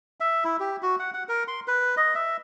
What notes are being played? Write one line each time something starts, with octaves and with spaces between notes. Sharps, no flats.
E5
E4
G4
F#4
F#5
F#5
A#4
C6
B4
D#5
E5